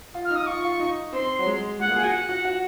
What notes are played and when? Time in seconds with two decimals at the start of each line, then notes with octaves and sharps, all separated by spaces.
0.14 F4
0.25 F6
0.30 D#4
0.36 D#6
0.47 F4 C#6
0.64 F4
0.79 D#4
1.13 C4 C6
1.39 F#3
1.46 G#3
1.80 G#3 F#5
1.88 A#3
1.96 G#4
2.03 F#4 G#5
2.12 F#5
2.29 F#4
2.45 F#4